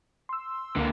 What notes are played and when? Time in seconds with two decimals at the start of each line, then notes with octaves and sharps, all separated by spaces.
0.29 C6 E6
0.76 C#2 D3 A#3